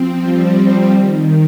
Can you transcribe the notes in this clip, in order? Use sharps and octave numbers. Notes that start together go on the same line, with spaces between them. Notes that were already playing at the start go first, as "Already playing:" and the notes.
Already playing: F3 C4
G3
D#3